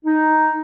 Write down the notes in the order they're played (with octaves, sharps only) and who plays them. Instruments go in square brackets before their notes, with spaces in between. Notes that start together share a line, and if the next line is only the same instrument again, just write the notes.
[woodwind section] D#4